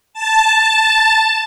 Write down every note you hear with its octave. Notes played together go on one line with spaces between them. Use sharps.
A5